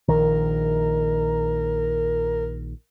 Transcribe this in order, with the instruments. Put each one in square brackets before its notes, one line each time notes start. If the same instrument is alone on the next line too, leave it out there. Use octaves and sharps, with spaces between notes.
[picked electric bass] A#1 D#3 [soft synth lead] A#4